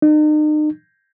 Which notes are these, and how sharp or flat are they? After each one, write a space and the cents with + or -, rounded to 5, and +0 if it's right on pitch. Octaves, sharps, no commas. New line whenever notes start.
D#4 -40